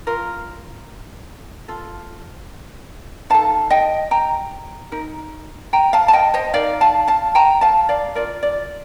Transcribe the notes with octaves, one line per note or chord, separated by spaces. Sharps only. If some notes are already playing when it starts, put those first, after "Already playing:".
F4 A#4
F4 A4
D#4 A4 F5 A5
D#5 G5
G5 A#5
D#4 A#4
G5 A#5
F5 A5
A5
D#5 G5
C5 D#5
D#4 A#4 D5 F5
F5 A5
F5 A5
G5 A#5
F5 A5
D5 F5
F4 A#4 D5
D5